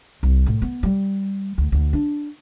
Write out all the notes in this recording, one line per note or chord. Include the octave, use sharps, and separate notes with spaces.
C2
A2
B3
G3
D2
D2
D4